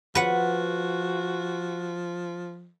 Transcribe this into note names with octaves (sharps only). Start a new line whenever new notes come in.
F3 F#4 B4 F#5